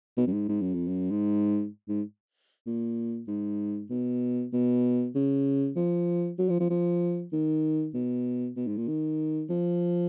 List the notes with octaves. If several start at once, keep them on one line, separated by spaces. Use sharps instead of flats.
B2
F#2
G#2
G#2
F#2
F2
F#2
G#2
G#2
A#2
G#2
B2
B2
C#3
F3
F#3
F3
F3
F3
D#3
B2
B2
G#2
A#2
D#3
F3